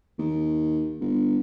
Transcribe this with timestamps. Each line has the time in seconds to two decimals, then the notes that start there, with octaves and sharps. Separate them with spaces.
0.19 D#2
1.01 G1